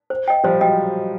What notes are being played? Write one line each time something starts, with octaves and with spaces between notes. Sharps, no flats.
C5
D#5 G5
F3 G3 C5
F#3 G#3 D#5 G5